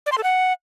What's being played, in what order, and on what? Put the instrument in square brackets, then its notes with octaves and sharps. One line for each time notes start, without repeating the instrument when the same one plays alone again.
[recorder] D5
C6
A4
F#5